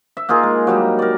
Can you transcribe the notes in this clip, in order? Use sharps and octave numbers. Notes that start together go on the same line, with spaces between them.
E5
A#3 D#4 F4 G#4
G#3
F#3 G3 D#4
A#4 D5